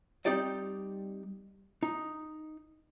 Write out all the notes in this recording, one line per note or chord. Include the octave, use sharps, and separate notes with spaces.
G3 C4 D#4 G4 D5 D#5
D#4